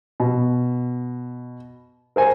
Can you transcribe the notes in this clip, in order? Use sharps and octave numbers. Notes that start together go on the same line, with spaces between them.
B2
A#4 C5 G#5